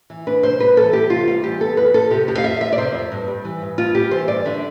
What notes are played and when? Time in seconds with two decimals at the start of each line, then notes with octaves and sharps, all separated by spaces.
0.10 E3
0.27 D4 B4
0.43 C3 C5
0.59 G3 B4
0.77 E3 A4
0.93 B3 G4
1.10 C3 F4
1.27 G3 F4
1.43 E3 G4
1.60 B3 A4
1.77 F2 B4
1.94 F3 A4
2.11 C3 G4
2.27 F2 G4
2.38 F5
2.44 F2 E5
2.60 F3 E5
2.73 D5
2.78 C3 C5
2.94 F2
3.12 G2
3.28 G3
3.45 E3
3.62 G2
3.78 G2 F4
3.95 G3 G4
4.11 E3 C5
4.28 G2 D5
4.45 D3 E5